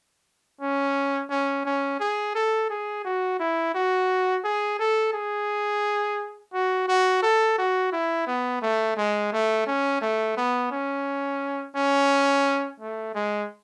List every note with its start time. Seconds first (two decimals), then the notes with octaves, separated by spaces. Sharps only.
0.61 C#4
1.30 C#4
1.65 C#4
2.00 G#4
2.35 A4
2.70 G#4
3.05 F#4
3.39 E4
3.74 F#4
4.44 G#4
4.79 A4
5.14 G#4
6.53 F#4
6.88 F#4
7.22 A4
7.58 F#4
7.93 E4
8.27 B3
8.62 A3
8.97 G#3
9.33 A3
9.67 C#4
10.01 A3
10.37 B3
10.71 C#4
11.76 C#4
12.80 A3
13.15 G#3